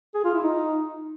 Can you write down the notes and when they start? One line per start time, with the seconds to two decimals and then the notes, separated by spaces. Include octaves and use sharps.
0.15 G#4
0.24 F4
0.34 E4
0.43 D#4